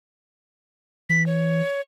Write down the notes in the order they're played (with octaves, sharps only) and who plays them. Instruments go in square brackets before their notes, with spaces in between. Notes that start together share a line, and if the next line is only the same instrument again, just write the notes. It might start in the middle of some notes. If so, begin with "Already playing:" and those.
[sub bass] E3 [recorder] B6
[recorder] C#5